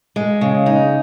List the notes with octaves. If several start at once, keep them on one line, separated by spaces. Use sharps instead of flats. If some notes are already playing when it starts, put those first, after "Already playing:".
G#3
C#3
D#4